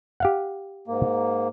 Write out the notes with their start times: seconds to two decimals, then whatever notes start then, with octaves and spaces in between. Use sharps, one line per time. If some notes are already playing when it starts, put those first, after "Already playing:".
0.20 G4 F5 F#5
0.88 G#2 A#3